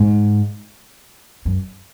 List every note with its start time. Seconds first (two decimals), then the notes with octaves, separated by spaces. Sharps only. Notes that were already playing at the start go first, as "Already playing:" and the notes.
Already playing: G#2
1.45 F#2